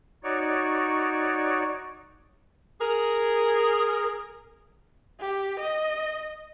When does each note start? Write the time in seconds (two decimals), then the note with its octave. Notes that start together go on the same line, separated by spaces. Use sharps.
0.24 D#4 F#4 C#5 D5
2.81 G#4 A#4
5.20 G4
5.59 D#5